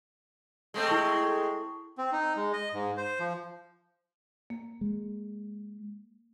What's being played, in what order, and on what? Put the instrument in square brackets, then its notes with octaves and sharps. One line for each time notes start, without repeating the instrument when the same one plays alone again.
[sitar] G#3 A3 C4
[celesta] E4 A5 C#6
[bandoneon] C4
D#4
G#3
D#5
G#2
C5
F3
[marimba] A#3
[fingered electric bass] G#3